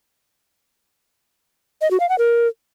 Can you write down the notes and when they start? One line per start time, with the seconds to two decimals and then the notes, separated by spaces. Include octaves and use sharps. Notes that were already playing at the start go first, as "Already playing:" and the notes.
1.82 D#5
1.91 F#4
2.00 F5
2.09 F#5
2.18 A#4